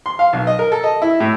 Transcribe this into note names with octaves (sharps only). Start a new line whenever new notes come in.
C6
F5
B1
D#5
A#4
A4
D#5
E4
A2